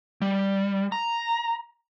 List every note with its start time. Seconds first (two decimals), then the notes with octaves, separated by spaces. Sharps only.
0.22 G3
0.92 A#5